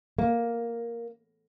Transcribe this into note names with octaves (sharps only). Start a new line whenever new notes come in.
A#3